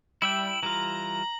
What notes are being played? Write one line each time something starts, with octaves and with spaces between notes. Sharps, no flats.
G3 E4 E5 G5 F#7
E3 G3 F4 A#5